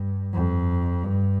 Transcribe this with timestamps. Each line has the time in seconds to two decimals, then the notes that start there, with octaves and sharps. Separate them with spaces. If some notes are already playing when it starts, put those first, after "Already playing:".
Already playing: G2
0.34 F2
1.03 G2